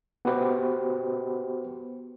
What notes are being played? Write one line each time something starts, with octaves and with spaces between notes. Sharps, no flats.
B3 F#4 G4 B4 C5